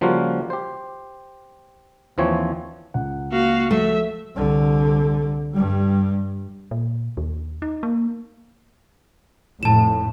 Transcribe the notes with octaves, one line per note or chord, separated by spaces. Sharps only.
C#3 F3 G3 A#3 F4 F#4
G4 C5
D#2 E3 F3 C4 C#5
C#2 F#5
A#3 F#4 F5
F3 A3 E5
C2 D3
G2 G3
A#2
D#2
D#4
A#3
F1 A2 A5 E7